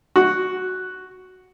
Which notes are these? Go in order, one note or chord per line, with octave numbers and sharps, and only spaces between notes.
F#4